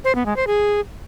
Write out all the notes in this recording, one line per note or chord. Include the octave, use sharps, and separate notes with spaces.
C5
B3
G#3
C5
G#4